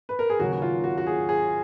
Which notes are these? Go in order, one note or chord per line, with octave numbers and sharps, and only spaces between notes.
B4
A#4
G#4
D#2 C#3 F#3 A#3 C#4 F#4
F#4
F4
F#4
F#4
G#4
G#4